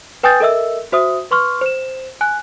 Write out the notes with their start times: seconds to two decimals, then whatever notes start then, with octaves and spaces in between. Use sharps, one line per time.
0.23 B4 G5 G#5 D#6 G6 A6
0.40 A4 A#4 D#5 E5 E6
0.92 F#4 C5 E5 D#6
1.31 B4 C6 C#6 F6
1.61 C5 E7
2.21 G#5 F#6